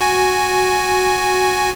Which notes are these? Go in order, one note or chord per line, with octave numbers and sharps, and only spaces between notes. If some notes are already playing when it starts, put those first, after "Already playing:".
F#4 G#5